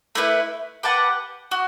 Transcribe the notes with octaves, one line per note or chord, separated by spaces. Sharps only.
A3 E4 B4
G4 B4 F#5 A5
F#4